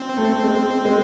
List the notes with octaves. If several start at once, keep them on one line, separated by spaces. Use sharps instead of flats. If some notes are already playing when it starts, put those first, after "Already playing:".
Already playing: C4
A3
G#3
G#3